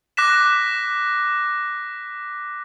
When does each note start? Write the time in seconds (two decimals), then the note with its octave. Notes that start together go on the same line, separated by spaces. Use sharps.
0.17 D6 F#6 A#6 B6 E7